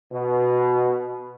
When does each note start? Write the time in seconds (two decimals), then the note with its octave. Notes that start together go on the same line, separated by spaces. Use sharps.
0.11 B2